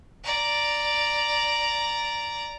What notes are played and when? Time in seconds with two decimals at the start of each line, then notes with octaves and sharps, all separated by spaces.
0.24 D5 A#5